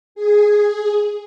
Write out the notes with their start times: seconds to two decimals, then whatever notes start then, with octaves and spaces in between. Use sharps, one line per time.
0.15 G#4